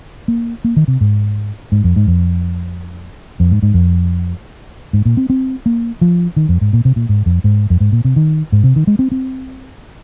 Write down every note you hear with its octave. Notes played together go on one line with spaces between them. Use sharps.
A#3
A#3
D#3
C3
G#2
G#2
F2
G#2
F2
F2
G#2
G#2
F2
G#2
A#2
C4
C4
A#3
F3
D#3
F2
G#2
A#2
C3
A#2
G#2
F2
G#2
F2
G#2
A#2
C3
D#3
G#2
C3
D#3
G#3
C4
C4